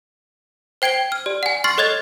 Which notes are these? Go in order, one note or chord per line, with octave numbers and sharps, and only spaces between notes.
C5 G5 G#6 D7 G7
F6
G4 D5
F#5 G#5
C6 C#6 F6 A6 C7
A4 C#5 D#5 G#6 A6 F7